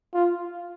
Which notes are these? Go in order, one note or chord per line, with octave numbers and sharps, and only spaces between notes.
F4